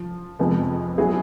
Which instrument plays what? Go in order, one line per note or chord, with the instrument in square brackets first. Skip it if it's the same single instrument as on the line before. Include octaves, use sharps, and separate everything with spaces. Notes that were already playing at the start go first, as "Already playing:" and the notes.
Already playing: [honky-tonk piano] F3
F2 C3 F3 G#3 B3
F#3 B3 E4 G#4